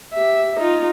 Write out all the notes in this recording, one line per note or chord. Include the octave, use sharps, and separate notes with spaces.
G4 E5
D#4 F4